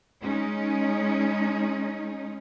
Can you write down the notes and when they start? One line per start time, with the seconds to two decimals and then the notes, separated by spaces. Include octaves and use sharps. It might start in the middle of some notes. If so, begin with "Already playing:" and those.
0.22 G#3 C#4 D#4